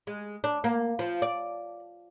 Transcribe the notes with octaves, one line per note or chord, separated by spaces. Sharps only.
G#3
D4
A#3
F3
D5